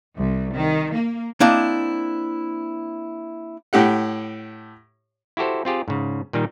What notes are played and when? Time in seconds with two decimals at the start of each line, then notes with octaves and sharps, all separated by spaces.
0.17 C2
0.54 D#3
0.93 A#3
1.40 A#3 C4 D4 E4 D#5
3.73 A2 G4 F#5
5.37 E4 F#4 G4 A4 C5
5.65 C4 F4 G4 G#4
5.88 G#2 C#3
6.33 A#2 D#3 G3 D#4